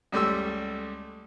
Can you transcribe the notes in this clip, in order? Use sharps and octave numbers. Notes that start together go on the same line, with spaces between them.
C#2 G3 A3 C6 E6